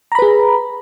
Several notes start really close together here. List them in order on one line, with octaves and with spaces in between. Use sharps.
A#5 B5 B4 G#4